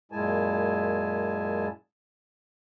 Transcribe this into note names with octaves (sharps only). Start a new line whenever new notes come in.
F#2 A#2 G#3 E4 G#5 A5